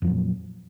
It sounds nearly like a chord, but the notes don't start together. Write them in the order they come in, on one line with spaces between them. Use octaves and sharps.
F2 F3 F#3 A#2